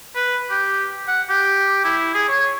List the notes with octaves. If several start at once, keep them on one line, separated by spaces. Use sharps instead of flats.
B4
G4
F#5
G4
E4
G#4
C#5